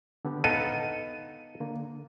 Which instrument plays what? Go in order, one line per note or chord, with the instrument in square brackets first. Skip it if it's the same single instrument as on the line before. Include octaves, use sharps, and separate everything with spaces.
[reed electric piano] D3 B3 G4
[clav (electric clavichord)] B3 D#4 A4 [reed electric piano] F5 [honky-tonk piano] D#7
[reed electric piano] D3 A#3